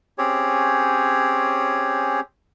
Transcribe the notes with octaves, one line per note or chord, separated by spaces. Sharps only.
C4 C#4 G4 G#4 C#5